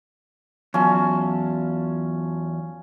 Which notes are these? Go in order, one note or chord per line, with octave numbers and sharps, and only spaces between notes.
E2 F#3 C#4 F4 A5